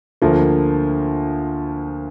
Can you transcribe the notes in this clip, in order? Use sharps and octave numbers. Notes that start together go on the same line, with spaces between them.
D2 D3 F3 A#3